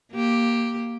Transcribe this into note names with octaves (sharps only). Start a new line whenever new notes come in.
A#3 G4